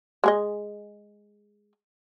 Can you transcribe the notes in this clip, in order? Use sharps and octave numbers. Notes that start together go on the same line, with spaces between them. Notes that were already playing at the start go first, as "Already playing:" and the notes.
G#3 G#4 D#5